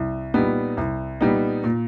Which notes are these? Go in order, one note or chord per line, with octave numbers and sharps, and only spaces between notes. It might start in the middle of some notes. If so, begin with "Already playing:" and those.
Already playing: C2
A#2 G3 B3 D#4
C2
A#2 G3 B3 D#4
A#2